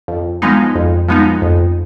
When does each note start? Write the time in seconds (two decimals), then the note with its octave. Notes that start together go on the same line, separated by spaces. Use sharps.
0.08 F2
0.42 F3 G#3 B3 D#4
0.75 F2
1.08 F3 G#3 B3 D#4
1.42 F2